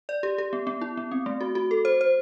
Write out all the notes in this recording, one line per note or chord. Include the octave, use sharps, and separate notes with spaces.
D5
G4
G4
B3
B3
E4
B3
C4
A3
F#4
F#4
A4
C5
C5